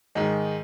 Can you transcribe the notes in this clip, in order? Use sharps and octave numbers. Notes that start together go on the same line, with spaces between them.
G#2 D#3 G#3